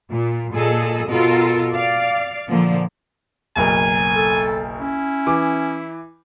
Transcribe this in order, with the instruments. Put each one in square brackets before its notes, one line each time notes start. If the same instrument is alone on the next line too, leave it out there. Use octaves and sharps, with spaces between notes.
[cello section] A#2
A#2 G#4 A4 D#5
B2 F4 A4 A#4
D5 F5
A#2 D3 F3 A#3
[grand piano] F#1 B1 A#4 [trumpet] G#5
[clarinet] A4
[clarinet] C#4 [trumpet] E4
[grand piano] E3 D6